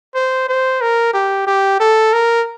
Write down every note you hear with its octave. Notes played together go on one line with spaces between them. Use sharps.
C5
C5
A#4
G4
G4
A4
A#4